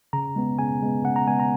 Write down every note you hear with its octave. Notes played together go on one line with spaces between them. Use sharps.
C#3 A#5
G#3 B3
C#3 G#5
G#3 B3
C#3 F#5
A#5
G#3 B3 G#5
A#5